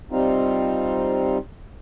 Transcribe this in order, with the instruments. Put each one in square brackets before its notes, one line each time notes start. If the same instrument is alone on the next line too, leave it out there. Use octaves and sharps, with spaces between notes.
[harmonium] C3 G3 C4 D#4 F4